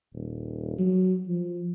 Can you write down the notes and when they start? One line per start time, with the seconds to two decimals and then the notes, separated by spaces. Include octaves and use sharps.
0.14 D#1
0.79 F#3
1.28 F3